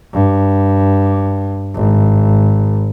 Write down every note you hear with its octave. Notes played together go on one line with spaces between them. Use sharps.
G2
G#1